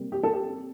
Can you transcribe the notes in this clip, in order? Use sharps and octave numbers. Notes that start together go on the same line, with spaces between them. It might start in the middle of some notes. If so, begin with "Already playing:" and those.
Already playing: C3 G3 A#3
G4
A4
G4